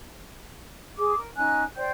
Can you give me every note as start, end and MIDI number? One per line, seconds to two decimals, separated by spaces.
0.97 1.15 68
0.97 1.15 86
0.97 1.15 87
1.16 1.29 70
1.36 1.63 61
1.36 1.63 63
1.36 1.63 80
1.36 1.63 90
1.76 1.92 72
1.76 1.92 74
1.76 1.92 79
1.76 1.92 91